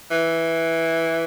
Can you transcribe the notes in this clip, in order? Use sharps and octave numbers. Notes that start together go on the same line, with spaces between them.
E3